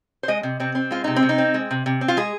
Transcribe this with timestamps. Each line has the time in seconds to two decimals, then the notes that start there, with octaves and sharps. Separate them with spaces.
0.23 C5
0.28 G#3 D#5
0.43 C3
0.60 C3 C4
0.75 C4
0.91 G#3 F4
1.04 C3 D#4
1.16 C4
1.23 C3
1.29 D#4
1.38 C4
1.54 G#3
1.71 C3
1.86 C3
2.01 C4
2.08 F4
2.17 G#3 G#4